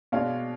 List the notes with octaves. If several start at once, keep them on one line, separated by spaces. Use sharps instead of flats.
B2 G#3 D4 C#5 F5